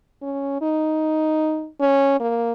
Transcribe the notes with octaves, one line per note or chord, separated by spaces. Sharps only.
C#4
D#4
C#4
A#3